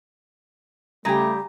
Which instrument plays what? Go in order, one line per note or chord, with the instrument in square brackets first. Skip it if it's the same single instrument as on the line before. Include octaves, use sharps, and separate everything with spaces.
[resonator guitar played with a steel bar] C#3 G4 [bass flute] G3 [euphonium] A3 [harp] G#5 A#5